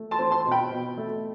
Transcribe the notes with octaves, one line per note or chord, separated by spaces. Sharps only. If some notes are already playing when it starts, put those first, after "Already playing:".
Already playing: A3
A5 C6
C4
A5 C6
B2
G5 B5
B2
A3